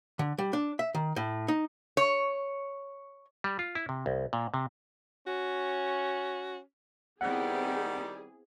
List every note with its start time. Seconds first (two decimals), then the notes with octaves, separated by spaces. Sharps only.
0.19 D3
0.38 G3
0.53 D4
0.79 E5
0.94 D#3
1.16 A2
1.48 D#4
1.97 C#5
3.44 G3
3.59 F4
3.75 E4
3.89 C3
4.06 C2
4.33 A#2
4.54 C3
5.27 C#4 F#4
7.21 D#3 G3 B3 C4 E4 G4 G#4 F#5